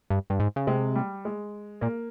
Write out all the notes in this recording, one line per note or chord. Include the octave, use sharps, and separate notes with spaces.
G2
G2
G#2
C#3
C3 G#3
G3
G#3
A#2 A#3